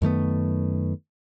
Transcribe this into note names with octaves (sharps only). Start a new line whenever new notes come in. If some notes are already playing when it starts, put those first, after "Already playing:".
F#2 D#3 A3 B3